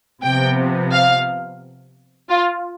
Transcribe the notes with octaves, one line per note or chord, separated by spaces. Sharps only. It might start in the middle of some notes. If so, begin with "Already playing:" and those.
C3 F3 B3 G5
F5
F4